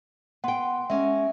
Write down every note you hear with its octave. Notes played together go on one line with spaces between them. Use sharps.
B3 F#5 G5 C6
G#3 C#4 E5